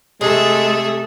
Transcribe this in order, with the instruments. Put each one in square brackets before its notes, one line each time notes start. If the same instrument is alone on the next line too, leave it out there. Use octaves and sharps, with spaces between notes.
[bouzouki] C3 [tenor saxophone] G#3 [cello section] A3 A4 [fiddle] G#4 E5